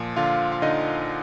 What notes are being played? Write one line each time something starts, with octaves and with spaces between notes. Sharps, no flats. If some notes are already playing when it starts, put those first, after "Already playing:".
Already playing: A#2 F3
D3 F4 F5
F5
D3 D#4 D#5